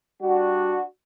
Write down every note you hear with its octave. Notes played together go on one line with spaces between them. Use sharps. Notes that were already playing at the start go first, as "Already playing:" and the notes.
G3 D4 F#4